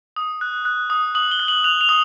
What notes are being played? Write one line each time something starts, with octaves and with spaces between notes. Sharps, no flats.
D#6
F#6
F#6
D#6
D#6 F#7
G7
F#6
F#7
F#6 F7
F7
D#6